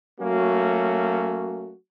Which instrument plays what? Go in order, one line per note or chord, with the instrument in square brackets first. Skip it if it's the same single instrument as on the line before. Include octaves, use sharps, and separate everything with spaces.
[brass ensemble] F#3 A3 A#3 C#4 F#4